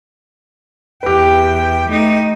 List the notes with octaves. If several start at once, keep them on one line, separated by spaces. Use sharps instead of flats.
E2 G4 B4 G5
A3 D#4